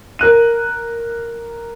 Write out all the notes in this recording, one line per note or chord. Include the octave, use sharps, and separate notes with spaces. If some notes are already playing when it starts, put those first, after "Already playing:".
A#4 F#6 D#7